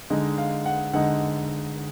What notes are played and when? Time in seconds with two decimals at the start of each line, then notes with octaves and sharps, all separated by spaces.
0.10 D3 G#3 D#4
0.38 F5
0.66 F#5
0.93 D3 G#3 D#4 F#5